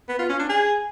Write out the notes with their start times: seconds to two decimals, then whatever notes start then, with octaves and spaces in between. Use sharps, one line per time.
0.09 B3
0.19 F4
0.29 C#4
0.39 D4
0.49 G#4